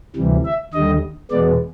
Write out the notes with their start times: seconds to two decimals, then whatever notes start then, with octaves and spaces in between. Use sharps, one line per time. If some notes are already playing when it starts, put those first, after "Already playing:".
0.16 D2 C3 E3 G3
0.45 E5
0.73 D#2 D3 G3 D#5
1.31 E2 B2 G#3 B3 D5